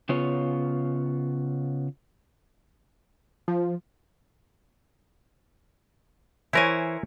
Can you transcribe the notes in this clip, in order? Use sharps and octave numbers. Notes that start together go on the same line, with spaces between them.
C#3 B3 F4 C#5
F3
E3 E4 A#4 C5 C#5 G#5